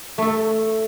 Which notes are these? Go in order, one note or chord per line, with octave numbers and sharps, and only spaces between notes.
A3 A4